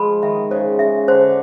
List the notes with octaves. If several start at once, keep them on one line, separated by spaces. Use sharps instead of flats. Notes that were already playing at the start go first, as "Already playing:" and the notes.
Already playing: F3 G#3 B5
D#3 E5
C#3 C5
C#3 E5
D3 C5